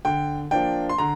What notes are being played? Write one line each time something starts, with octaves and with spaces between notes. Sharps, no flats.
D3 G5
F3 A#3 D4 G5
C6
D3 A#5